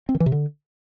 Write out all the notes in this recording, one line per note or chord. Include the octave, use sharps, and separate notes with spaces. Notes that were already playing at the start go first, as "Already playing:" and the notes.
C4
D#3
E3
C3
D3